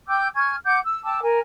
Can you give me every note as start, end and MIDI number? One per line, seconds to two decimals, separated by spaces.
0.08 0.28 79
0.08 0.28 86
0.08 0.28 88
0.08 0.28 91
0.35 0.55 80
0.35 0.55 85
0.35 0.55 89
0.35 0.55 92
0.65 0.79 78
0.65 0.79 86
0.65 0.79 91
0.83 1.03 88
1.04 1.20 79
1.04 1.20 81
1.04 1.20 86
1.04 1.20 88
1.22 1.39 70
1.22 1.39 80